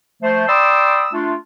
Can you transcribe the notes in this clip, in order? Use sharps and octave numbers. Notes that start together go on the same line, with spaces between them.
F3 A3 C5
D5 G5 B5 C6 D#6 E6
A3 D4 F4